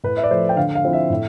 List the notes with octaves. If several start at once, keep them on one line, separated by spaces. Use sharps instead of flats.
A2 B4
E5
D5
F3 A3 C5
G5
D3 F5
F5
F3 C4 E4
E5
A2